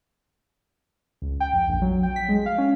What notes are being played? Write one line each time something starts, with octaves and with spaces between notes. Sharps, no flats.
C#2
G5
F2
A#1
F#3
G5
B6
G#3
F5
C#4